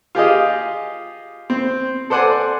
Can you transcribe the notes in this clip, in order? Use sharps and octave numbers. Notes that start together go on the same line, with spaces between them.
F4 G4 G#4 D#5
C4
A4 C5 D5 F#5 G#5